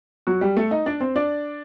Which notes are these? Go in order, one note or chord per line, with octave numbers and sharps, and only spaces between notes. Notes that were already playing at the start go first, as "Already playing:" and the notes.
F#3 F#4
G3 G4
A3 A4
D#4 D#5
D4 D5
C4 C5
D4 D5